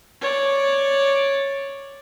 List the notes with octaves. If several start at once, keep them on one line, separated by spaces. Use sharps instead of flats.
C#5 D5